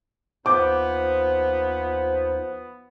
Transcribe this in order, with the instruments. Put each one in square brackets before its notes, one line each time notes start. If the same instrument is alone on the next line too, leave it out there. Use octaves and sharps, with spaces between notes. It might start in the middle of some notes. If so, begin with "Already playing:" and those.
[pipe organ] D#2 D#4 C5 [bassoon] F3 [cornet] B3 [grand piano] D6 G6